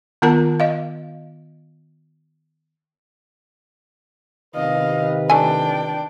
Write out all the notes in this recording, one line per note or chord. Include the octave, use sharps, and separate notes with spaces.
D#3 B3 F4 A#4 A5 A#5
D#5 F5
C3 D#3 B4 D#5 F5
A3 D4 G5 G#5